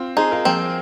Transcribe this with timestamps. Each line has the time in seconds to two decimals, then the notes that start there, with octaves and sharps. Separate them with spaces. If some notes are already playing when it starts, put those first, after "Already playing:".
Already playing: C4 F4
0.17 D#4 G#4 C5
0.31 F4 A#4
0.45 F3 A#3 C4